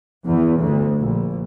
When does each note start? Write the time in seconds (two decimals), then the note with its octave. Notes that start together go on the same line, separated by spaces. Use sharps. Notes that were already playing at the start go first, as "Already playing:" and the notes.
0.24 E2
0.60 D2
0.98 A#1